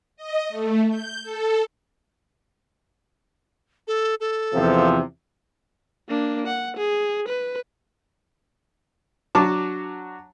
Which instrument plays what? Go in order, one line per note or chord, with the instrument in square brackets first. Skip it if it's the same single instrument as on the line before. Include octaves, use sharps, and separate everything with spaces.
[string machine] D#5
A3
G6
A4
[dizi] A4
A4
[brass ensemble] E2 C3 F3
[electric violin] A#3 D4
F#5
G#4
B4
[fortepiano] F#3 D4 F#4 A5 D6